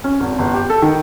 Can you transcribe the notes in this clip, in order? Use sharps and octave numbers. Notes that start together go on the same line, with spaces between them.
C#4
G#1
G1
G4
A4
D#3